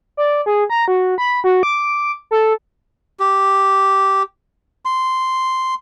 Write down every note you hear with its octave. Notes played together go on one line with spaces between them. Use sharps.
D5
G#4
A#5
F#4
B5
F#4
D6
A4
G4
C6